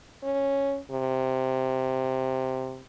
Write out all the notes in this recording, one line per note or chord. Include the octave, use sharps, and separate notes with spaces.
C#4
C3